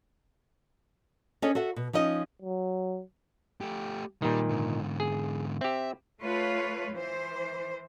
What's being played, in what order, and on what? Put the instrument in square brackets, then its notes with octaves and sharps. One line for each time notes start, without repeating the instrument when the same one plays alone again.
[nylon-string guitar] C#4 D4 G#4 A4 C#5 D#5
F#4 A4 E5 F#5
B2
F3 C#4 D#4 D#5
[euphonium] F#3
[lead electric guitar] A3 G4
[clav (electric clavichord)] A#2 D#3 [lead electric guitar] G3
[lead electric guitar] G#2 D3
[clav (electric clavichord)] G#4
[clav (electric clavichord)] C4 G4 [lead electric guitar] E5
[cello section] A3 F4 B4 C#5
E3 C5